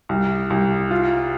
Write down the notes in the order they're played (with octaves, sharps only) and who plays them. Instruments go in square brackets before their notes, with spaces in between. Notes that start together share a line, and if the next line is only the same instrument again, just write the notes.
[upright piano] C2
C2
F4